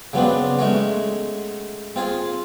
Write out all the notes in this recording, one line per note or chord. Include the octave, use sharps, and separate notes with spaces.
C#3 F#3 B3 C4 D4
G#3 A3 C#4 F#4
C4 F4 G#4